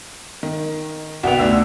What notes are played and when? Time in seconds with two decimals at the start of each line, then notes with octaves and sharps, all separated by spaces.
0.43 D#3
1.23 C2 B3 F#4 G5 F7
1.39 D2 B2 D4 E6